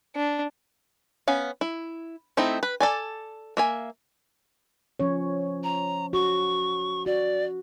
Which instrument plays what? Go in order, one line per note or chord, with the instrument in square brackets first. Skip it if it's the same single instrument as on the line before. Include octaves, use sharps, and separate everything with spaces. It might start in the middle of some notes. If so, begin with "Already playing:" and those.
[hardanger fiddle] D4
[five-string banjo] B3 C#4 F5
E4
A3 C4 D#4 E4
B4
A4 D5 G#5
A#3 E5 G#5
[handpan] F3 C#4 C#5
[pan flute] A#5
[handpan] F#4 [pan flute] C#6
[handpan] F#4 [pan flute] D5